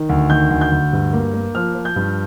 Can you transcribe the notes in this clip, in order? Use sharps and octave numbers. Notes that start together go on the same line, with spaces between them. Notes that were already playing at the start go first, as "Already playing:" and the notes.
Already playing: D#3
D2
D#3 G6
D2
G6
D2
G2
A#3
A#3
F3 F6
F3
G6
G2